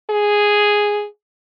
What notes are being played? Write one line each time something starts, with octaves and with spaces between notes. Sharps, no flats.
G#4